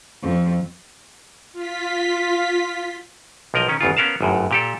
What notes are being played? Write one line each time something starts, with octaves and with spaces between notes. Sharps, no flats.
F2
F4 B6
B1 F3 A#4 D#5
D#3 C#4
G1 E2 C#3 F4
B3 C#4 A#4 F5 A5
G1 F#2 A2
A#2 G4 A4